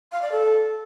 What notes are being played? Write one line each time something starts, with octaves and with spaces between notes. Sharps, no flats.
F5
D5
A4